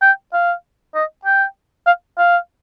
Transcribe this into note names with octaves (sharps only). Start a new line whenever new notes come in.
G5
F5
D#5
G5
F5
F5